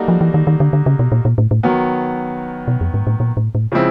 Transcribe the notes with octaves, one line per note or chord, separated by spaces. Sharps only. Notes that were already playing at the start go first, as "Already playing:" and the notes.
Already playing: G3 A#3 D#4 F#4 A4
F3
E3
D#3
D#3
D3
D3
C#3
B2
A#2
A#2
A2
A2
D#3 F#3 B3
B2
F2
G#2
A2
A#2
A2
A2
C#3 F3 G#3 C4 E4